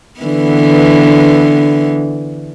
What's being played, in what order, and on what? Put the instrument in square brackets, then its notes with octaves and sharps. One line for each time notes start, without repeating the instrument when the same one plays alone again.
[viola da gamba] D3 E3 B3